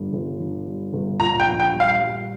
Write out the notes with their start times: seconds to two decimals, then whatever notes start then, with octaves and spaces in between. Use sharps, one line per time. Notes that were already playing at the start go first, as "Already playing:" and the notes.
Already playing: G1 G2
0.13 G1
0.40 D3
0.66 G2
0.93 G1
1.19 A#2 A#5
1.40 G5
1.46 A#1
1.60 G5
1.73 G3
1.80 F5
1.99 G3